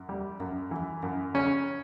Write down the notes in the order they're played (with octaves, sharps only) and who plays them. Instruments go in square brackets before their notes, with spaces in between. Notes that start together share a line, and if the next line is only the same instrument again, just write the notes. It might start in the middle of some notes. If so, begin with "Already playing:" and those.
Already playing: [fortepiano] F#2
G3
F#2
E3
F#2
C#3 C#4